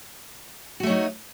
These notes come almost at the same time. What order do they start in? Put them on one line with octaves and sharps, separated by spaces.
F#4 A3 F#3 D#4